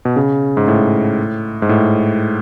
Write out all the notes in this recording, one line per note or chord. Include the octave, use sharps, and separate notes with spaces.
B2
C#3
G#2
A2
G#2
A2